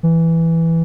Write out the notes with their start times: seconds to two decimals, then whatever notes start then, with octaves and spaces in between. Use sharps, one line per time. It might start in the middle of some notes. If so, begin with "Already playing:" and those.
0.03 E3